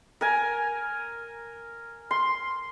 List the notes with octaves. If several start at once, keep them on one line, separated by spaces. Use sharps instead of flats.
A#4 G#5
C6